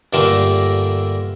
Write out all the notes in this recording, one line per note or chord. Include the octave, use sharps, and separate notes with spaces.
G2 A#2 D3 A3 A#3